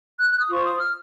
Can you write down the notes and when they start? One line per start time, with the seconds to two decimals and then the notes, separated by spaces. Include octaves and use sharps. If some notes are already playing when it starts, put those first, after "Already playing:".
0.18 F#6
0.29 F#6
0.40 D#6
0.49 F4 C5 C#6
0.65 D#6
0.80 F6